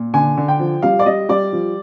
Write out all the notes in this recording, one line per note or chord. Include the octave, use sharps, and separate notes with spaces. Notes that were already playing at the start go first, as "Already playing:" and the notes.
Already playing: A#2
D3 G#5
D3
G5
F3
G3 F5
D5
G3 D#5
G3 D5
F3